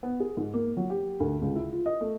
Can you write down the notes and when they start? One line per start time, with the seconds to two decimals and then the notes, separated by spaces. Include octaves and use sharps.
0.03 B3
0.20 G#4
0.37 G#2
0.54 A#3
0.77 F#3
0.90 G4
1.20 D2
1.42 C#2
1.55 E4
1.73 F4
1.86 D#5
2.01 A3